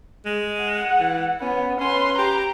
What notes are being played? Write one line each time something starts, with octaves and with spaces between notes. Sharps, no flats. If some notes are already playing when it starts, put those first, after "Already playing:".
G#3
F#5
E3
B3 C#4
C#4 B4 C6
G4 A#5